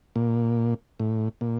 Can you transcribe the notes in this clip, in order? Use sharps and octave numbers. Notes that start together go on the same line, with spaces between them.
A#2
A2
A#2